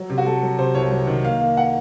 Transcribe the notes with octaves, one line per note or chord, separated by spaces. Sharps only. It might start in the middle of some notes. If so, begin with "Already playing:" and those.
Already playing: F#3
C3
F#4
F#3 A4
F#3
C3 C5
C2 C#5
F#3
D#3
A#3 F5
A#3
F#5